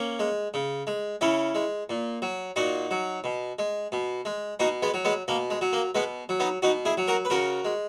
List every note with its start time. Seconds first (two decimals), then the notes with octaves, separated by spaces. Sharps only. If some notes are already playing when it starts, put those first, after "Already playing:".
Already playing: A#3 C#4
0.19 G#3
0.54 C#3
0.87 G#3
1.21 C#3 C#4 E4
1.55 G#3
1.89 A#2
2.22 F#3
2.56 A#2 D#4 F#4
2.91 F#3
3.24 B2
3.59 G#3
3.92 B2
4.25 G#3
4.60 B2 D#4 F#4
4.83 G#3 B3
4.94 F#3
5.05 G#3 B3
5.28 B2 A#3
5.50 G#3
5.61 F#3
5.73 A#3
5.95 B2 G#3 B3
6.29 F#3
6.40 B3 D#4
6.62 B2 D#4 F#4
6.85 E4 G#4
6.97 F#3
7.08 F#4 A#4
7.25 B4
7.30 C#3 F#4 A#4
7.65 G#3